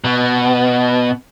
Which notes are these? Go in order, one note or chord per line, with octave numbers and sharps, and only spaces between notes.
B2